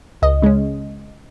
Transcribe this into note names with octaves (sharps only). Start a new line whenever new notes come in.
C#2 D#5
C#3 G#3 C#4